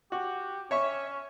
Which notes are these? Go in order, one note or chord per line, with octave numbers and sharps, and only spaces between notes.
F#4 G4
C#4 C#5 E5 C#6